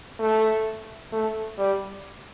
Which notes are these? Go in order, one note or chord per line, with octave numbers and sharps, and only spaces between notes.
A3
A3
G3